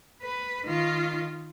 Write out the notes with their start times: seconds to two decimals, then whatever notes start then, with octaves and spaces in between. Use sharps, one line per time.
0.22 B4
0.65 D#3 F4